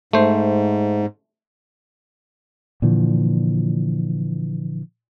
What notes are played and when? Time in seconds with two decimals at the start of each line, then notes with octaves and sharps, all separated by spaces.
0.13 G#2 A3 C5
2.82 A#2 D3 E3 F3